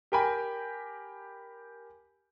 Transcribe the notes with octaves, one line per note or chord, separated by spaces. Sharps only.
G4 A#4 G5 G#5 B5